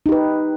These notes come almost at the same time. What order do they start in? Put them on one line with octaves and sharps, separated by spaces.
D#4 G4 B4